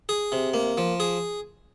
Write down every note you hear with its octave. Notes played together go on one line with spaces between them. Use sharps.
G#4
C3
A#3
F3
G#4